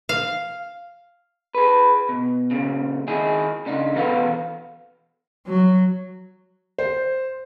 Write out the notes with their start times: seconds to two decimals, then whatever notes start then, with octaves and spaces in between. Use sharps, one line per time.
0.09 F5
1.55 G#4 B4
2.09 B2
2.51 A#2 C#3
3.07 D#3 D#4 E4 G#4
3.66 C#3 D4 D#4
3.95 B2 E3 B3 A4 F5
5.47 F#3
6.78 C5